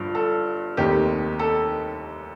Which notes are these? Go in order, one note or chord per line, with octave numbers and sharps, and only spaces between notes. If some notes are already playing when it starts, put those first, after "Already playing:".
Already playing: G1 G2 F3
A4
F1 D#2 D#3 G4
A4